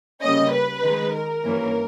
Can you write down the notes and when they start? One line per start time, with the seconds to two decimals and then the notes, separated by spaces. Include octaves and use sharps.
0.22 C#3 G3 A#3 C#4 D#5
0.53 B4
0.83 D#3 G#3 D#4
1.14 A#4
1.45 G2 E3 A#3 C#4